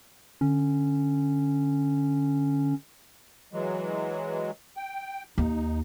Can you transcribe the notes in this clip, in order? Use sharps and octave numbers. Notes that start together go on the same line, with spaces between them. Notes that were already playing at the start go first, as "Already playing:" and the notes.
D3 C#4
E3 F#3 G#3
G5
D#2 D#4